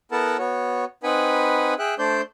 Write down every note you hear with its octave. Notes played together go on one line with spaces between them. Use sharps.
B3 E4 A4 A#4 F#5 A5
B3 F#4 C#5
C4 D#4 B4 F#5 G#5 B5
G#4 E5 G5 F#6
A3 D4 C5 D5 G6